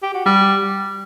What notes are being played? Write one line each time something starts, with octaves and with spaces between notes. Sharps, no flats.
G4
F#4
G3